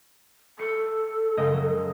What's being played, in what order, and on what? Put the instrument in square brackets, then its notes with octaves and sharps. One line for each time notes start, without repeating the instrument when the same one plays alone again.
[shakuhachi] A4 [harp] C#7
[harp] F#1 G#3 D#5
F#3